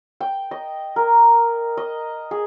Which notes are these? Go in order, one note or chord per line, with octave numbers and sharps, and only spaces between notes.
G5
D#5
A#4
D#5
G#4